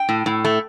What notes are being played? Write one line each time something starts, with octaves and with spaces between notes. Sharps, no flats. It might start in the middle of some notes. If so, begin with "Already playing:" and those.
Already playing: G5
A2
A2
A3